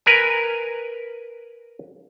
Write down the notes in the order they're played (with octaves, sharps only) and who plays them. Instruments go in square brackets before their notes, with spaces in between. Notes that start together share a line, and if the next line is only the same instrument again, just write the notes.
[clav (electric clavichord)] A#4 B4 G#5